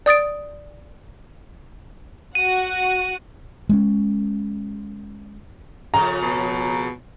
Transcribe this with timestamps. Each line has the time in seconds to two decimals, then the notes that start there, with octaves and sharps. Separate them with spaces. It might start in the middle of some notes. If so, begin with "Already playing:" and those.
0.06 D5 D#6 A6 D7
2.35 F#4 F#5 D#7
3.69 G#3 A3 C#4
5.94 F2 C#3 A#5
6.22 B2